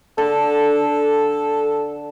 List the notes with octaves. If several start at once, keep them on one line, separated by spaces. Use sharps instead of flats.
D3 A4